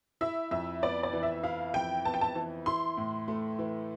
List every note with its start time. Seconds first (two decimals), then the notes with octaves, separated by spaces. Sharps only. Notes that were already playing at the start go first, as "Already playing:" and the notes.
0.21 E4 E5
0.51 F2 E5
0.82 B3 D5
1.03 D5
1.13 E3
1.23 E5
1.43 E4 F5
1.74 F2 G5
2.05 B3 A5
2.14 G5
2.21 A5
2.35 E3
2.66 E4 C6
2.97 A2
3.28 A3
3.59 E3